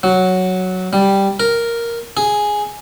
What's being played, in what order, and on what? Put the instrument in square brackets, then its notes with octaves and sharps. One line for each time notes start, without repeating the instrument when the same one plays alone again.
[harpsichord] F#3
G3
A#4
G#4